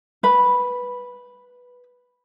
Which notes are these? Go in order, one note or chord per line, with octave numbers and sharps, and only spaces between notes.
B4 B5